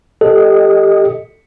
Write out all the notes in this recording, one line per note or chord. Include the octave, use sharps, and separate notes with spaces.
G4 A4 D#5